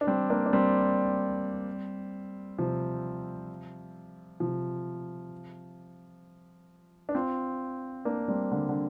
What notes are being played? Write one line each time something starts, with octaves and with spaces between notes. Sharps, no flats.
D4
G3 C4
A#3 D4
D4
G3 C4
C3 F3
C3 F3
D4
C4 F4
A#3 D4
G3 C4
D3 G3
D3